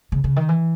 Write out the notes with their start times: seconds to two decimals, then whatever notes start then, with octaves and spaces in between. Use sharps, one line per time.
0.12 C#3
0.24 C#3
0.36 D#3
0.49 E3